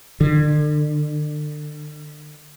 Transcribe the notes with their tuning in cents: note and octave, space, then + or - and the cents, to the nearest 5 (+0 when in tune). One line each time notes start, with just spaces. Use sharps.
D3 +35